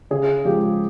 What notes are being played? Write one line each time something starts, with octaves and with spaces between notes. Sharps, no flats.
C#3 G#4
F3 G#3 G4